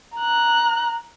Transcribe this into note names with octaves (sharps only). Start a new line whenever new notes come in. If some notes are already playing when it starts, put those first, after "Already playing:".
A#5 F#6